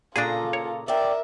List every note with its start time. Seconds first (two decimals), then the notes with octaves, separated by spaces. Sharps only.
0.16 A#2 C#3 D4 F4 G#4 A4 A#5
0.53 C#5
0.88 A#4 D5 E5 G5